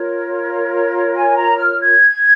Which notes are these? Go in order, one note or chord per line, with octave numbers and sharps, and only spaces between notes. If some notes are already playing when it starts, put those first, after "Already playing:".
Already playing: F4 A#4 C#5
G#5
A#5
F6
G#6